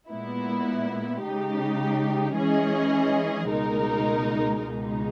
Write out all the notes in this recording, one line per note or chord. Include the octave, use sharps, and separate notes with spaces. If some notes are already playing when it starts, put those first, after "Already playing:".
A#2 G#3 B3 E4
C#3 G#3 D#4 G4
E3 G#3 C#4 G#4 D#5
C#2 B2 G#3 D#4 A#4
C#2 B2 G#3 D#4